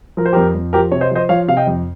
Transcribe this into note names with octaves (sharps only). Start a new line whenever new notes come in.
F3 A#4
C5
F2 G4 A#4
F2
F3 G4 A#4
C3 C#5
C5 D#5
F3 C5 D#5
F3 C#5 F5
C3 F5
D#5 G5
F2